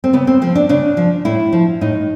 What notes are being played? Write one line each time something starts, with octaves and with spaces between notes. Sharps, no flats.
C4
C#3 B3
C4
F3 C4
D4
C#3 D4
F3
A2 E4
F3
A2 D#4